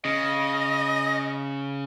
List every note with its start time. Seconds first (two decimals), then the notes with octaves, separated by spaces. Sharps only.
0.05 C#3 D#5